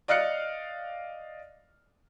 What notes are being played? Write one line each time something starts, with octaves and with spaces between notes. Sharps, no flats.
D5 D#5 F5 F6 F#6 C#7